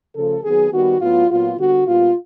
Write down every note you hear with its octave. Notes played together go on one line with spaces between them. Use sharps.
C#3 F3 A3 A4
D#3 F#3 B3 G#4
D#3 G3 B3 F#4
A2 F#3 B3 F4
A#2 F#3 B3 F4
D3 G3 B3 F#4
A#2 G3 B3 F4